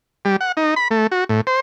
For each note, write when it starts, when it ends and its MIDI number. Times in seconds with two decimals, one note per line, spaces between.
0.25 0.36 55
0.41 0.52 78
0.57 0.75 63
0.76 0.88 83
0.91 1.07 57
1.12 1.24 66
1.29 1.41 45
1.47 1.60 72